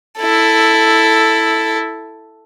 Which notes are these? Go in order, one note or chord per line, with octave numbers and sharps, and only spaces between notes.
E4 A4